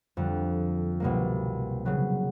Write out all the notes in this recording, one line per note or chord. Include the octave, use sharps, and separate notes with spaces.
F2 D3 G3
C2 B2 G3 A#3
C#3 F#3 B3